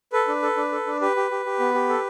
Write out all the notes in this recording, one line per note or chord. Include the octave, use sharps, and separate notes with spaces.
A4 B4
D4
A4
D4
A4
D4
G4 B4
G4
G4
G4
B3
G4
A4